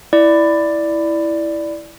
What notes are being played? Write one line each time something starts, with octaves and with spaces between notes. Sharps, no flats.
E4 D5